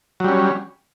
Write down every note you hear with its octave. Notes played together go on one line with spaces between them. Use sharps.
F#3 G3 C#4